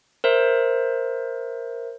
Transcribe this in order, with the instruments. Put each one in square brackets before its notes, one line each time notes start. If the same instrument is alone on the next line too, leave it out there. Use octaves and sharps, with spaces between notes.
[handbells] A#4 C5 E5